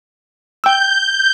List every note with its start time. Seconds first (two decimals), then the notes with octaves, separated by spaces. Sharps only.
0.64 G5 E6 G6